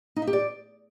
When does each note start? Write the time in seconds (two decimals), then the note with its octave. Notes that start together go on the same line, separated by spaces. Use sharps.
0.16 D#4
0.22 E5
0.27 G4
0.33 D5